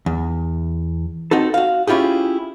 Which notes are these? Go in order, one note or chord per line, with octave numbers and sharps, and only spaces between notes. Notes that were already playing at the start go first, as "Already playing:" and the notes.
E2
C4 D#4 F#4 A4
F#4 F5
C#4 E4 F4 G4 G#4